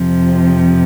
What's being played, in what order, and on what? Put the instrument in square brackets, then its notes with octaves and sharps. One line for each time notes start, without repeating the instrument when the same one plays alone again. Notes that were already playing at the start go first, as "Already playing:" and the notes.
Already playing: [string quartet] F2 C3 F3